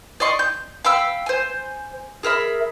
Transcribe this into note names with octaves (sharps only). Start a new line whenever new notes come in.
D5 D#5 C6 C#6
G6
F5 G5 B5 E6
C5 G#5
G#4 A#4 E5 B5